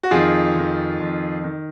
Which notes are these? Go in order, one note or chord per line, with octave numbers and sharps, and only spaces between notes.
F#4
F2 D#3 F4 G#4
F2 D#3
F2 D#3
D#3